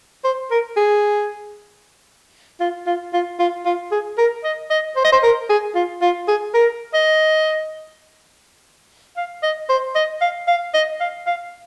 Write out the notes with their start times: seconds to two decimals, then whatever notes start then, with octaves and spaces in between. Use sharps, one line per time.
0.24 C5
0.51 A#4
0.77 G#4
2.60 F4
2.87 F4
3.13 F4
3.39 F4
3.65 F4
3.92 G#4
4.18 A#4
4.44 D#5
4.70 D#5
4.97 C5
5.04 D#5
5.12 C5
5.23 A#4
5.49 G#4
5.75 F4
6.02 F4
6.28 G#4
6.54 A#4
6.94 D#5
9.17 F5
9.43 D#5
9.69 C5
9.95 D#5
10.21 F5
10.48 F5
10.74 D#5
11.00 F5
11.27 F5